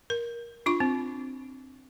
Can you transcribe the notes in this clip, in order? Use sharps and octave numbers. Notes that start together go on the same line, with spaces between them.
A#4
D4 F4 C#6
C4